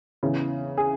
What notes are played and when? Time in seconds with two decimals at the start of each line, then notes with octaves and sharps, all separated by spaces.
0.23 E2 C#3 E3
0.77 G#4